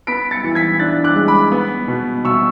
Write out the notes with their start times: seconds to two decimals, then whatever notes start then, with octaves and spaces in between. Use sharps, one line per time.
0.07 B3 B6 D7
0.31 A6 C#7
0.44 E3
0.55 G#6 B6
0.79 D4 F#6 A6
1.04 D6 F#6
1.16 G#3
1.28 B5 D6
1.52 B3
1.88 B2
2.25 B2 C#6 E6